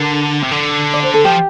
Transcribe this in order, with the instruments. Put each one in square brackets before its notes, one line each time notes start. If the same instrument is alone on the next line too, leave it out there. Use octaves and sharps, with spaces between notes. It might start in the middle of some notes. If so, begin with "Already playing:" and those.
Already playing: [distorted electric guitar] D3 [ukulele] A#4
[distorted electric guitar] C3
D3
[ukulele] D5
C5
A4
[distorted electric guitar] F3 [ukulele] G4